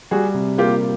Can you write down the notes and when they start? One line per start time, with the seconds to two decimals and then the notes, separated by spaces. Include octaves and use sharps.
0.11 G3 F#4 G#4
0.34 C3
0.58 A#3 F4 G4